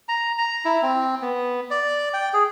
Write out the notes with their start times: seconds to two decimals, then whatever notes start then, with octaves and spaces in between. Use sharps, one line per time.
0.08 A#5
0.38 A#5
0.65 E4
0.83 C4
1.22 B3
1.71 D5
2.14 G5
2.33 G#4